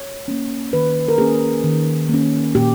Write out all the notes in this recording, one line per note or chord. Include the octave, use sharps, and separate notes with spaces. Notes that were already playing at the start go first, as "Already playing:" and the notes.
Already playing: C#5
A#3 C#4
D#3 B4
A#4
A#3 C#4 G#4
D#3
A#3 C#4
A#2 G4